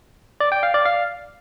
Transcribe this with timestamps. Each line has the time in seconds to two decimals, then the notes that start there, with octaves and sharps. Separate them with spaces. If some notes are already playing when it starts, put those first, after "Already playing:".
0.40 D5
0.52 G5
0.63 F5
0.74 D5
0.85 F5